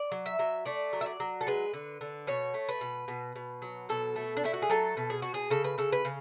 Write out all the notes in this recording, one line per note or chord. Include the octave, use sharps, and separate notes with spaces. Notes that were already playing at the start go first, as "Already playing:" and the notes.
Already playing: D5
F#3
E5
F#3
A3 D5
F#3
E5
D5
F#3
A4
G#3 B4
D3
D3
B2 C#5
A3
B4
B2
B2
B2
F#3
B2 A4
A3
D4
A3 E4
F#4
G#4
F#3 A4
B2
G#4
B2 F#4
G#4
C#3 A4
B4
C#3 A4
B4
C#3